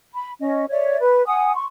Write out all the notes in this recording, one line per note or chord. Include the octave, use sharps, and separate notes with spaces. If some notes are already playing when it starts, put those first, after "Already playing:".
B5
C#4 D#5
C#5 D5 E5
B4
F#5 G#5 D#6
C6 C#6